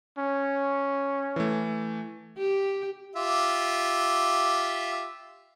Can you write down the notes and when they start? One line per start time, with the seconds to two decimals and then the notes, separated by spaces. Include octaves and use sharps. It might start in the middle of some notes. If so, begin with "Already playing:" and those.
0.18 C#4
1.36 E3 A3
2.37 G4
3.16 F4 G4 E5